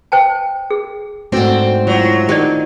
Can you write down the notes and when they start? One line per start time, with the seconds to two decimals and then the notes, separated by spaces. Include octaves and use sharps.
0.12 C5 G5 A5
0.71 G#4
1.32 G#2 A3 C4 D4 F#4
1.87 F#3 E4 F4
2.29 D#3 D4 D#4 G4 D5